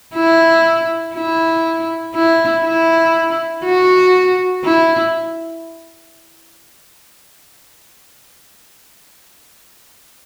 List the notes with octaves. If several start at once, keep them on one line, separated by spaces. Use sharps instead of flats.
E4
E4
E4
E4
F#4
E4